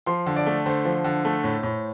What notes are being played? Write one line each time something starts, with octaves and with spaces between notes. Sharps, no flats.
F3 C6
D3
D5
A3
D3 C5
F3
D3
A3
A2
A2